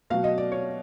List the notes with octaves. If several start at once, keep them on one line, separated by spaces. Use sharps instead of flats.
B2 F#3 F5
D#5
D5
C#5